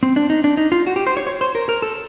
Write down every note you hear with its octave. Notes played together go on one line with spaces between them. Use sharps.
C4
D4
D#4
D4
D#4
F4
F#4
G4
C5
C#5
C#5
C5
A#4
A#4
A4